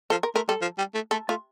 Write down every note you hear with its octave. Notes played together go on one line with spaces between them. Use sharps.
F3 A4
A#4
A3 A#4
G3 A4
F3
G3
A3
A3 A4
A3 F4